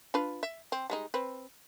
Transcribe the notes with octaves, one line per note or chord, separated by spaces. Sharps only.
D4 F4 B4
E5
C4
G3 G#3 D#4
C4 B4